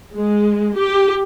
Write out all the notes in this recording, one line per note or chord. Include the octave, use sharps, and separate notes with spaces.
G#3
G4